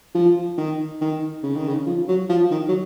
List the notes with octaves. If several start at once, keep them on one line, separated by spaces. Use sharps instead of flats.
F3
D#3
D#3
C#3
D#3
C#3
F3
F#3
F3
D#3
F#3